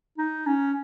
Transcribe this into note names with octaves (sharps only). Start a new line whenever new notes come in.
D#4
C#4